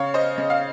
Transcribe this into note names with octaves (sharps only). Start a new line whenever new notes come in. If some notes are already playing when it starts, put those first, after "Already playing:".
Already playing: C#3 C#5 F5
C5 D#5
C#3
F5